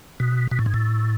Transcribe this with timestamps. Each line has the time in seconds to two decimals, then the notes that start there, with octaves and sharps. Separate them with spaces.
0.20 B2
0.51 B2
0.59 A2
0.66 G#2
0.74 A2